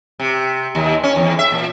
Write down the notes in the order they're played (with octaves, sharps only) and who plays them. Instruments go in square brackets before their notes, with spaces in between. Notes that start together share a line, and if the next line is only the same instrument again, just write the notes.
[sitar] C3
D#2
C#4
E2
E5
A#2